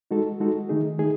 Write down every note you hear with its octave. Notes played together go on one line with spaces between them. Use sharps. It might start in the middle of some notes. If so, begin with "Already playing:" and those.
G#3 D#4 F#4 A4
G#3 D#4 F#4 A4
D#3 A3 D#4 G#4
D#3 A3 D#4 G#4